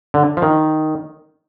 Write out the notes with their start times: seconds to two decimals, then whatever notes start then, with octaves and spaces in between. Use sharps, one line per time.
0.14 D3
0.37 F3
0.42 D#3